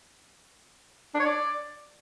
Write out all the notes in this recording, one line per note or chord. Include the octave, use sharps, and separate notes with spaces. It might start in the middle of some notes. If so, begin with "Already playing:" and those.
D4
C#5
D5